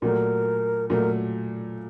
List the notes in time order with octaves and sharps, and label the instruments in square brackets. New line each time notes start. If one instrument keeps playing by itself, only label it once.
[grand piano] A#2 F#3 A3 [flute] A#4
[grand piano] A#2 F#3 A3 [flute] A#4